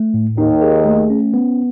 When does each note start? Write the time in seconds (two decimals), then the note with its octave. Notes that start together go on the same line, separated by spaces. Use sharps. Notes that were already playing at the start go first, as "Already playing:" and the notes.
Already playing: A3
0.14 A2
0.38 D#2 D#3 D#4
0.62 G#4
0.86 A3
1.10 C#4
1.34 B3